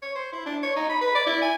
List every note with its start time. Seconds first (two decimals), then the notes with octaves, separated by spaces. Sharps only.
0.02 C#5
0.15 C5
0.32 E4
0.46 D4
0.63 C#5
0.76 D#4
0.89 B5
1.01 B4
1.15 D5
1.26 E4
1.42 G#5